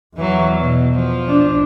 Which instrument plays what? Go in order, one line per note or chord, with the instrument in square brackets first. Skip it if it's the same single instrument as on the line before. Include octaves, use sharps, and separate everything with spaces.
[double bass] E2 [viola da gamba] E3 F#3
[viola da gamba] B2
F3
[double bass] D4